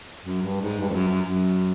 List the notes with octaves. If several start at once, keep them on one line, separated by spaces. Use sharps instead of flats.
F#2
G2
G#2
G2
F2
F#2
F#2
F#2